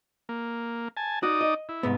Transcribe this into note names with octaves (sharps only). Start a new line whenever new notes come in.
A#3
G#5 A5
D#4 F#4 D5 D#6
D#5
E4
C2 G#2 B3